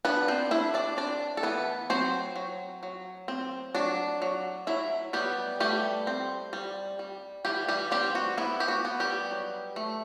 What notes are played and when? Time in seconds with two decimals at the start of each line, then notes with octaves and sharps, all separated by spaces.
0.05 B3 D4 B4
0.28 C4 C5
0.51 D4 E4 E5
0.74 D4 D5
0.97 C4 D4 D5
1.37 A4
1.43 E3 B3 B4
1.90 F#3 C4 C5
2.36 F#3
2.83 F#3
3.28 C4
3.75 F#3 D4 D5
4.22 F#3
4.67 F#3 E4 E5
5.13 G3 B3 G4
5.60 G3 A3 G4
6.07 C4
6.53 G3
6.99 G3
7.45 E3 G3 G4
7.68 G3 G4
7.91 G3 C4 G4
8.15 F#4
8.38 B3 E4
8.60 G4
8.68 F#4
8.85 B3
9.00 G3 G4
9.31 F#3
9.76 A3